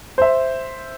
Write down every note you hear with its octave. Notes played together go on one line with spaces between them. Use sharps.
C5 E5